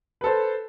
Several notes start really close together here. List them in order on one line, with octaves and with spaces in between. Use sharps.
B4 A4 C5